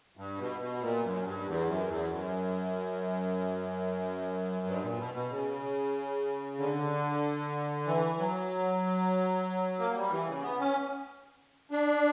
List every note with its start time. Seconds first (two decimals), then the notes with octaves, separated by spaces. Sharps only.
0.17 G2
0.38 B2
0.60 B2
0.81 A#2
1.03 F#2
1.24 G2
1.46 E2
1.67 F#2
1.88 E2
2.09 F#2
4.66 G2
4.82 A#2
4.98 B2
5.14 B2
5.30 C#3
6.59 D3
7.87 E3
8.18 F#3
9.79 A#3
9.95 G3
10.11 E3
10.27 C#3
10.42 B3
10.59 C#4
11.71 D4